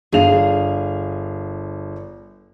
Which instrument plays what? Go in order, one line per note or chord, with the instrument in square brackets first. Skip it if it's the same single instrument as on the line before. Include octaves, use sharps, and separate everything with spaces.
[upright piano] G1 D4 F7 [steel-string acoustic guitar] G#4 F5